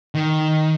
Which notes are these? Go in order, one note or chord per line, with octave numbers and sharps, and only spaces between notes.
D#3